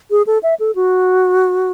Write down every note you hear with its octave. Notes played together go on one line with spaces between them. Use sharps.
G#4
A4
E5
A4
F#4